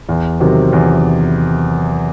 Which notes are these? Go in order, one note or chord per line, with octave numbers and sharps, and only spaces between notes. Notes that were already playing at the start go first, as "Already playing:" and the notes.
E2
C3 D#3 F#3 C4
E2